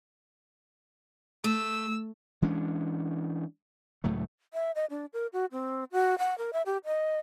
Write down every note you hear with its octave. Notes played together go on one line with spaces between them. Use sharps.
A3 E6
E3 G#3 C#4 D4
C#2 A2 F#3 A3
E5
D#5
D4
A#4
F#4
C4
F#4
F#5
A#4
E5
G4
D#5